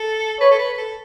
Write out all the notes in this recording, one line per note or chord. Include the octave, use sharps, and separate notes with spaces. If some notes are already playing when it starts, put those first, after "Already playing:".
Already playing: A4
B4 C#5
A4
B4
B4
A4